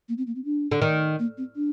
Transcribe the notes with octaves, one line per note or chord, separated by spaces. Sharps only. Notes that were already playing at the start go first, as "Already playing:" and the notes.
A#3
C4
A#3
C4
D4
D3
D#3
A#3
C4
D4